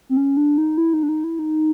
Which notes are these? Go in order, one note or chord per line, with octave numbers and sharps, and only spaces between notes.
C4
C#4
D4
D#4
E4
D#4
D4
D#4
E4
D#4